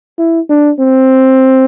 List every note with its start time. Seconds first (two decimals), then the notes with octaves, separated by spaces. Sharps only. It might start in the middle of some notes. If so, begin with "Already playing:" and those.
0.19 E4
0.49 D4
0.79 C4